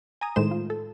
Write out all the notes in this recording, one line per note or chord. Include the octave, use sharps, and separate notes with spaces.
G#5 A#5 D#6
A2 D#3 G#3 C5 E7
F4
A4